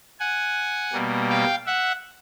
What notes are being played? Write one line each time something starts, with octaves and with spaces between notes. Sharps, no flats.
F#5 G#5
B2 G3 A#3
F5 G5
E5 F#5